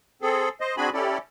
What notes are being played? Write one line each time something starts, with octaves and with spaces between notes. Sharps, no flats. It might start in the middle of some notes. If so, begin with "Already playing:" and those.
C4 G#4 A4
C5 D#5
C4 D4 F#4 G#4 G#5 B5
C#4 E4 G4 A4 D5